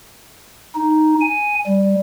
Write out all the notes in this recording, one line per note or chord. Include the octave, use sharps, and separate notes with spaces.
D#4
G#5
G3